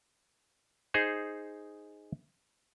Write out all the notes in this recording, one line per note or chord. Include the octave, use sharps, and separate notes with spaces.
D#4 G#4 C5